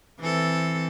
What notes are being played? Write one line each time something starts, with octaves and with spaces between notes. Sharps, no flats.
E3 C4 A4